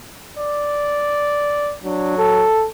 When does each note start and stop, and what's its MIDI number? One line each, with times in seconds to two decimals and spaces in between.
0.37 1.75 74
1.84 2.48 54
1.84 2.15 62
2.18 2.66 69